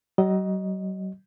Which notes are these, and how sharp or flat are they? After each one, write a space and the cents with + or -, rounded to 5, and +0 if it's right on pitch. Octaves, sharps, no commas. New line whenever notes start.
F#3 +45 D#5 +0